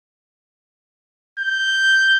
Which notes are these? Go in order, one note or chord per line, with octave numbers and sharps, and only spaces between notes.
G6